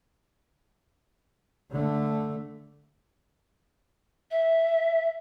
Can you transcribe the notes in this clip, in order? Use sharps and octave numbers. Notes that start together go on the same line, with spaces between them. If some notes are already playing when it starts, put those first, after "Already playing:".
D3 A3
E5